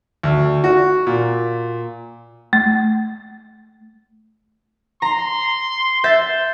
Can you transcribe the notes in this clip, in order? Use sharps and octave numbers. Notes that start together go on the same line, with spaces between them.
D2
F#4
A#2
A3
A#5 C6
E5 G6 A6